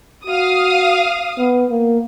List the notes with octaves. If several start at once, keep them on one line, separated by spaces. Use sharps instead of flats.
F#4 F5 D#6
B3
A#3